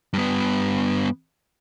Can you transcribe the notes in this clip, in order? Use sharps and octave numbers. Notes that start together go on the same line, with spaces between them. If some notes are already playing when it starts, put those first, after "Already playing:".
G2 B3